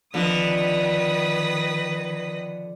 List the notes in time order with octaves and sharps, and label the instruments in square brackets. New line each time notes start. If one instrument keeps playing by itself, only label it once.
[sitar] D3 [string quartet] D#3 D#6 [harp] F3 C4 D#5 [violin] B4